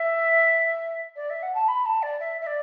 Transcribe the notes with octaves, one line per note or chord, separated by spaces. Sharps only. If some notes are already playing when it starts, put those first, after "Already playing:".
Already playing: E5
D5
E5
F#5
A5
B5
A5
D5
E5
E5
D5